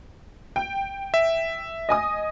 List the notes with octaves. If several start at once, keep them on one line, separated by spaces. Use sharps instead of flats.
G5
E5
D#5 G#5 D#6